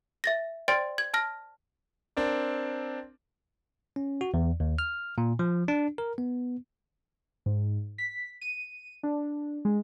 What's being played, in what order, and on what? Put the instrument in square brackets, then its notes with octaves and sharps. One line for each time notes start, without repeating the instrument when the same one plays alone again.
[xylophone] E5 A6 A#6
C5 D5 G5 C6 A6 D7
G#6
A5 F6 A#6
[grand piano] C4 D4 A#4 D5
[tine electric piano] C#4
F#4
E2
D#2
F6
A#2
F3
D4
A#4
B3
[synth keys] G#2
B6
D#7
D4
G#3